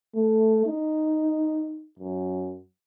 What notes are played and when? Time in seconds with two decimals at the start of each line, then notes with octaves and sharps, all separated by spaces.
0.15 A3
0.66 D#4
1.99 F#2